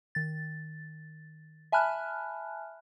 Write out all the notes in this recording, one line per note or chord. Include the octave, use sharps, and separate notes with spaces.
D#3 A6
E5 G#5 A5 B5 F6 F#6